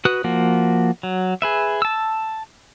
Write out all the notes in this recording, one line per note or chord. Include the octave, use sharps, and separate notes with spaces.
F#4 B4 D#6 F#6
F3 A#3 F#4
F#3
G#4 B4 E5
A5 E6